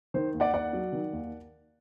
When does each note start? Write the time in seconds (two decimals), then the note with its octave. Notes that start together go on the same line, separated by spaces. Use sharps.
0.14 D#3 C5
0.34 D#2
0.40 D5 F#5
0.53 D#2 D5 F#5
0.73 F#3
0.93 D#3
1.13 D#2